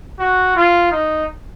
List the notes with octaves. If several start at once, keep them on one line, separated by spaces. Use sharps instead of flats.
F#4
F4
D#4